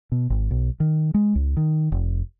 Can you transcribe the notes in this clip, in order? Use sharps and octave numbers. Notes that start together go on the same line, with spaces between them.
B2
G#1
B1
D#3
G#3
C#2
D#3
F1